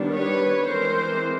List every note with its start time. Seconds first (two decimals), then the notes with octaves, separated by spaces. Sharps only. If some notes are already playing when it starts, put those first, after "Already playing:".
Already playing: D#3 G3 B3 D4
0.13 B4 C#5
0.66 E3 G#3 C4 A#4 C5